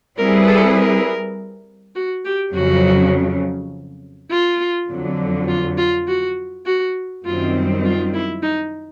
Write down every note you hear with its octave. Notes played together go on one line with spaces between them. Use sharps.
G3 C4 E4 G#4 A#4 B4
A4
A#4
F#4
G4
F2 C#3 F#3 F#4
F4
F2 D3 F#3
F4
F4
F#4
F#4
F#2 D#3 G3 C4 F4
F4
E4
D#4